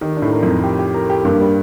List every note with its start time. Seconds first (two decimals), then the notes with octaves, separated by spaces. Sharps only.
0.01 D#3 G4
0.17 D4
0.22 A2
0.32 A#4
0.43 F2 A#4
0.63 G4
0.79 G4
0.94 A#4
1.10 G4
1.25 G2 A#3
1.41 G3